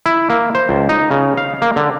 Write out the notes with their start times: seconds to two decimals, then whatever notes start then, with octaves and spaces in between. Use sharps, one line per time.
0.06 E4
0.30 A#3
0.55 C5
0.69 C#2
0.89 D#4
1.11 C#3
1.37 F5
1.62 A#3
1.76 D3